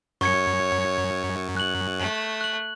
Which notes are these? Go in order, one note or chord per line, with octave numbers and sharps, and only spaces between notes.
F#2 C#5 C#6 G#6 C#7
F#6 F#7
A3
F#6 F#7